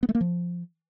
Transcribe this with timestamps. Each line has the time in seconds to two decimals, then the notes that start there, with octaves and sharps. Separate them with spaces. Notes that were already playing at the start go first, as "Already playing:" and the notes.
0.03 B3
0.09 A3
0.15 A#3
0.21 F3